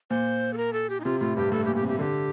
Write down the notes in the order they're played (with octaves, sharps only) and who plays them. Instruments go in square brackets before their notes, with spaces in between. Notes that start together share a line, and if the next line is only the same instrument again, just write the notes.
[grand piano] A#2 [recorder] C5
[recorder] A4
A#4
A4
G4
D#4
[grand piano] C3 [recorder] F4
[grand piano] A2 [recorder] F4
[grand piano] G2 [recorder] G4
[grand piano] A2 [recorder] A4
[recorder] G4
[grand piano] A#2
[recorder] G4
[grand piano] C3
[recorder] G4
[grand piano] D3 [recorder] G4